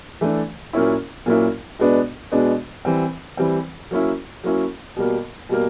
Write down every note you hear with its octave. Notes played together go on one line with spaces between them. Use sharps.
E3 A3 D4
A#2 F#3 A#3 C#4 E4
A#2 F#3 A#3 C#4 E4
B2 G#3 B3 D4
B2 G#3 B3 D4
E3 G3 C4
E3 G3 C4
F#3 A#3 C#4 E4
F#3 A#3 C#4 E4
B2 G3 A#3
B2 G3 A#3